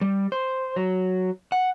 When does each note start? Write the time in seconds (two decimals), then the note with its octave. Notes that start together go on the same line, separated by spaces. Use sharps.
0.01 G3
0.32 C5
0.76 F#3
1.52 F#5